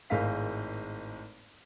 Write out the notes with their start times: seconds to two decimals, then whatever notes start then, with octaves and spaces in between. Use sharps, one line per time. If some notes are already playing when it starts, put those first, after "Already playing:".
0.10 G#1 A2 G#3 F5 B6